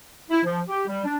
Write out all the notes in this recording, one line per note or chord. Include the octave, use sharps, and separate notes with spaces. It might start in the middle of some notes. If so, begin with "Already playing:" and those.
E4
F3
G4
G3
D4